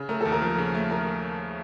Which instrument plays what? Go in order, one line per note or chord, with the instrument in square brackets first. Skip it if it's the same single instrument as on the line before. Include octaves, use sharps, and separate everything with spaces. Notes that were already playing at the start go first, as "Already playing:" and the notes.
Already playing: [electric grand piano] C#3
[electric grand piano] A3 [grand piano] A#4
[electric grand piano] D#2 [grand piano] A4
[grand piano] A#4
[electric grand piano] F3
C#3
A3
[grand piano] A#4